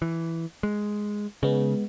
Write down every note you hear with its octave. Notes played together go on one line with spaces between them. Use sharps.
E3
G#3
C#3 G#3 B3